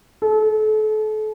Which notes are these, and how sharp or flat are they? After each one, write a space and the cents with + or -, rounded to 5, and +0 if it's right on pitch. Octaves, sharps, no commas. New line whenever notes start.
A4 -35